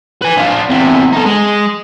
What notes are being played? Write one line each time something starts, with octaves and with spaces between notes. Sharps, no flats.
B4 G#5
D4 F4
E2 C3
D#4 A4
G#3